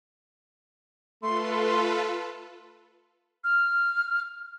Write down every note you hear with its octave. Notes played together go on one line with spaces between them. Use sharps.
A3 F4 A4 B4 C6
F6